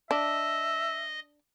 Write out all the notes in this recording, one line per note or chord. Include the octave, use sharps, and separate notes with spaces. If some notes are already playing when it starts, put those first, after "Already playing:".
D4 D#5 E5